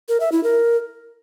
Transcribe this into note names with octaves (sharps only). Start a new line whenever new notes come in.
A#4
E5
E4
A#4